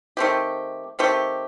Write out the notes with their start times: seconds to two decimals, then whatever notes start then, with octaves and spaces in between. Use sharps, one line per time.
0.17 D#3 A3 C4 G4
0.99 D#3 A3 C4 G4